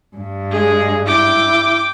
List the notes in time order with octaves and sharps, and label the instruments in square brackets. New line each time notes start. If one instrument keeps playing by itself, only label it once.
[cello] G2
[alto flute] G#3 [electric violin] G#4
[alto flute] E4 [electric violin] G5 D6